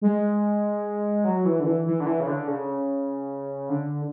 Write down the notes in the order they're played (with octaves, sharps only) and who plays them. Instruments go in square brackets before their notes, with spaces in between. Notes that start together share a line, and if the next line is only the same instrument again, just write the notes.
[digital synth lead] G#3
F#3
E3
D3
E3
E3
D3
E3
C#3
D3
C#3
D3